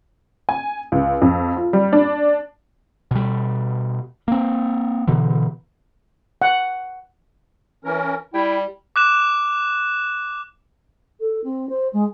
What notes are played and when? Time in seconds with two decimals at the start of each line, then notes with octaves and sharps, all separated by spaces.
0.49 G#5
0.92 C#2
1.22 F2
1.56 F4
1.73 G3
1.93 D4
3.11 B2 G3
4.28 A#3 C4
5.08 B2 D3 E3
6.42 F#5
7.85 E3 C#4 A#4
8.34 G3 E4 G5
8.96 D6 F#6 E7
11.20 A4
11.44 C4
11.69 C5
11.93 G#3